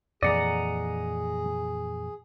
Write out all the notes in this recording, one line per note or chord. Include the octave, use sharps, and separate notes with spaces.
F2 A#2 E3 G#4 D5 D#5 F#5 A#5